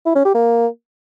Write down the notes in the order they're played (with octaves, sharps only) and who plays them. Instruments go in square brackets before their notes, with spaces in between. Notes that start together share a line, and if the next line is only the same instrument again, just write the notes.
[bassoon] E4
C#4
G4
A#3